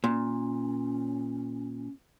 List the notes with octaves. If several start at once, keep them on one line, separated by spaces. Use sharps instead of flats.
A#2 C#4